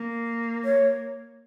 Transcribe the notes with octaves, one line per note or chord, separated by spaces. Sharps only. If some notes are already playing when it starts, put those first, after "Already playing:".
Already playing: A#3
C#5